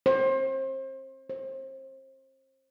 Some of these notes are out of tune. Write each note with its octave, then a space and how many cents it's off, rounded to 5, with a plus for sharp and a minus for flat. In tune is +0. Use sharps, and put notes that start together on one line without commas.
C5 +30
C5 +30